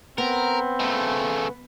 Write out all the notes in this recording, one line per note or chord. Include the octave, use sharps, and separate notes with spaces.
B3 C4 A#4
C#3 A3